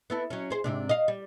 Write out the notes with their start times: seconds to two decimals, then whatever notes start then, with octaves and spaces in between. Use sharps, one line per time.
0.10 B3 E4 A4
0.30 F#3 C#4
0.50 G#4 C5
0.64 G#2 C3 D4
0.89 D#5 F5
1.08 G3